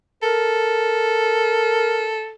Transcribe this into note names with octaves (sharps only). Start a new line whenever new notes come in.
A4 A#4